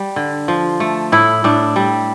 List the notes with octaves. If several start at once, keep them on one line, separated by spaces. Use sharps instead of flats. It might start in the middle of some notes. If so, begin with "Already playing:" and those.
Already playing: G3
D3
F3
A3
A2 E4
A2 D4
G3